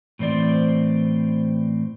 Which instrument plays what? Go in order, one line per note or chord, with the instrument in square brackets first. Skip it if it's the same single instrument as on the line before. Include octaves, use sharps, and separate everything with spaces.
[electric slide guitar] A2 E3 C4 C5 D5